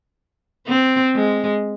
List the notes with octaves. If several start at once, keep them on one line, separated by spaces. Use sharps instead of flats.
C4
G#3